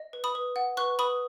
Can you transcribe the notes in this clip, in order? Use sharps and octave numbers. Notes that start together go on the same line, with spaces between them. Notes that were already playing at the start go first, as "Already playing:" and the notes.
Already playing: D#5
B4
B5 D#6
B4
F#5
B4 C#6 F#6
B4 B5 D#6